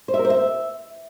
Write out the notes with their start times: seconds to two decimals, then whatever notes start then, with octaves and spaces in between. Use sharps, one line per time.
0.08 C5
0.14 E5
0.19 A#4
0.25 C5
0.30 E5